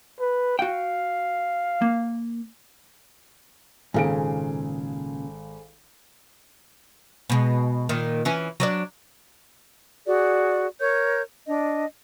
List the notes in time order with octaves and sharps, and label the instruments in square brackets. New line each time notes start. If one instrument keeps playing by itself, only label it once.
[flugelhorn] B4
[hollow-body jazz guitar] F#4 G5 [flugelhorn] F5
[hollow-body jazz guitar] A#3
[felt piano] G#1 D7 [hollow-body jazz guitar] A#2 C#3 [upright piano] G#4 A4 F5
[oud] B2 G#3
A#2 D#3
E3 C#4
F#3 D4 D5
[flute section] F#4 G#4 D5
A#4 C#5 G6
D4 D#5